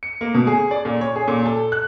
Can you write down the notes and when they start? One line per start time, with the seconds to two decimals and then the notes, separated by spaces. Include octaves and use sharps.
0.03 C#7
0.21 A#3
0.34 B2
0.47 G#4
0.71 D5
0.85 A#2
1.01 C#5
1.16 G#4
1.28 A#2
1.46 A4
1.72 F#6